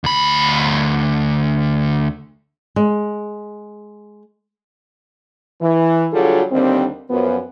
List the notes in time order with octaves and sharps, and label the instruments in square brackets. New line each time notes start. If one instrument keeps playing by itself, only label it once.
[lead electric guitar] D2 B5
[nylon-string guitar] G#3
[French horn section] E3
D3 F#3 G3 F4 G#4 A4
D#2 D3 G3 C4
F#2 F3 B3